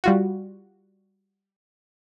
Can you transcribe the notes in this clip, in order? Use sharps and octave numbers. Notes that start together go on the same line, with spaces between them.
G3 F4 F#4